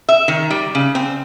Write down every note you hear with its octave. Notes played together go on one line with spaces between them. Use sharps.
E5
D#3
G3
C#3
C4